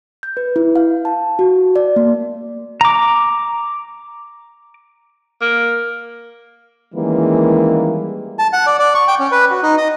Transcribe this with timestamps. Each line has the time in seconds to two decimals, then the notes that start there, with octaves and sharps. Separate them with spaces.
0.23 G6
0.37 B4
0.56 E4
0.76 F5
1.05 A5
1.39 F#4
1.76 D5
1.96 A#3
2.81 A#5 D6
5.41 A#3
6.94 D#3 E3 G3 G#3 A#3 C#4
8.39 A5
8.53 F#5
8.66 D5
8.79 D5
8.94 C#6
9.08 G5
9.19 C#4
9.31 B4
9.51 F#4
9.63 D#4
9.77 D#5